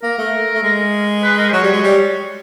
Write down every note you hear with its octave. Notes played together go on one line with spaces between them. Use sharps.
A#3 A#4
A3
A3
G#3
B4
A#4
C5
F#3 C#5
G3
G#3
G3